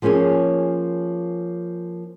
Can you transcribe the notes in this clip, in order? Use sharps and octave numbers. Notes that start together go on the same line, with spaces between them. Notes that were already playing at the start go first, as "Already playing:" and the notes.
F3 A#3 C#4 G#4 C#5